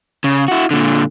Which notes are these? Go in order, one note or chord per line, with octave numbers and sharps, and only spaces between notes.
C#3
E4 F#4
A#2 D3